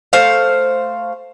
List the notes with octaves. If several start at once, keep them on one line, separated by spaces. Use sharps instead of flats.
A3 C5 F5